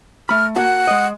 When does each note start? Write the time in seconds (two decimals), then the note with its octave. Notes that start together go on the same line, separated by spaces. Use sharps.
0.29 A3 B5 F6
0.56 A#3 F#4 F#5 A5
0.87 G#3 D#5